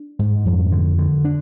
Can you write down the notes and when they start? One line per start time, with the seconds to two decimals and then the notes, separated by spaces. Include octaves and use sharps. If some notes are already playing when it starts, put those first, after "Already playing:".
Already playing: D4
0.19 G#2
0.45 F2
0.71 D3
0.98 D3
1.24 D4